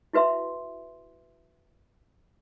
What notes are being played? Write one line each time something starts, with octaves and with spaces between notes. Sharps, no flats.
E4 F#4 B4 E5 C6